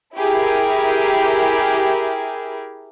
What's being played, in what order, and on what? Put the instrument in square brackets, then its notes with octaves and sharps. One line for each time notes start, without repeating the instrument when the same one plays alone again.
[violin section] E4 G4 G#4 A#4